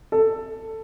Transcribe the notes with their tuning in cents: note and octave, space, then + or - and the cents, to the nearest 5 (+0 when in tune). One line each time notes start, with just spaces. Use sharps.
A4 +10